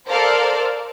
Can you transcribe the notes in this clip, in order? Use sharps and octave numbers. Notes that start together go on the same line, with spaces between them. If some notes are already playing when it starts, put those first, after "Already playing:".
A4 A#4 C5 D5 F5